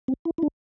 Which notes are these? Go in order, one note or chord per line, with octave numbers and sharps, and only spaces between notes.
C4
E4
E4
D4